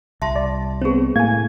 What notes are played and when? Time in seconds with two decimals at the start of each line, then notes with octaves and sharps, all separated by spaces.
0.22 C2 E5 A5 C6
0.36 D5
0.82 B3 C4 G#4 C#5
1.16 A2 A#3 G#5 G#6